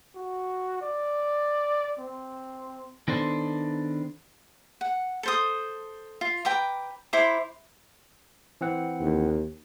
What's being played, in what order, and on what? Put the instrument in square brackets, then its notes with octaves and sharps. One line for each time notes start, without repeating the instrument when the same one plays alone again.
[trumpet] F#4
D5
C4
[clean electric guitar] D#3 B3 D4 A4 C5
[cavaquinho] F#5
A4 C5 D#6
F4
B4 G5 A#5 D6
E4 C5 A#5 D6
[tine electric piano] E3 C4 F#5
[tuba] D#2